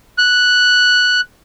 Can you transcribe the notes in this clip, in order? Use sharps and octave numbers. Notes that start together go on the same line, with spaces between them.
F#6